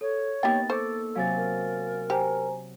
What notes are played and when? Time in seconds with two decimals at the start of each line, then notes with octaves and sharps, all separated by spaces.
0.01 A4 C#5
0.43 A#3 B3 D#4 G4 G5 A6
0.70 A4 C5 C#6 D6
1.16 C3 F#3 F5 G#5 A6
1.36 A#4
2.10 G4 C5 G#5 A#5